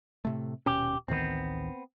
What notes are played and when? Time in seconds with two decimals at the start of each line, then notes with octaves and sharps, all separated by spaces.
0.25 A2 C3 A3
0.66 D#1 B2 C#4 G4
1.08 A1 D2 D#3 B3 C4